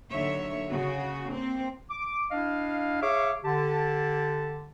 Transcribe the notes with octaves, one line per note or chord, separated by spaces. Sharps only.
D#2 D3 F#3 C#5 E5
C#3 F#4
A#3 C4
D6
D4 E4 D#5 F5
G#4 C#5 E5 F5 C#6 D6
D3 G4 A5